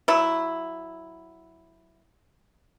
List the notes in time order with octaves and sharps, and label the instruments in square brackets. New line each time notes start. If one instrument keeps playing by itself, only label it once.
[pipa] F#3 E4